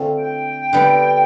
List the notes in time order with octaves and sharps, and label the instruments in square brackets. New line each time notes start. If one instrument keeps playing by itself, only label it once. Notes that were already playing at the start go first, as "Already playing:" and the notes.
Already playing: [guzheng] D3 A3 C4 F4
[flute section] G5
[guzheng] D3 G3 B3